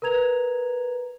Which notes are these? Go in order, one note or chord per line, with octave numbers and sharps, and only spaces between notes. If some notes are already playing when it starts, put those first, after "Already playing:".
A#4 B4 A#5 G#6 F7